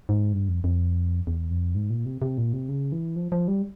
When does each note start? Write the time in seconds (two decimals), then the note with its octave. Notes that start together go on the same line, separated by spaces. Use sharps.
0.09 G#2
0.33 G2
0.48 F2
0.64 F2
1.27 E2
1.51 F2
1.75 G#2
1.90 A#2
2.06 C3
2.22 C3
2.38 A#2
2.53 C3
2.69 C#3
2.92 E3
3.16 F3
3.32 F3
3.48 G3